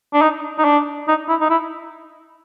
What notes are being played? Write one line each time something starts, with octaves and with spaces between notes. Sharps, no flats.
D4
D#4
D#4
D4
D#4
E4
D#4
E4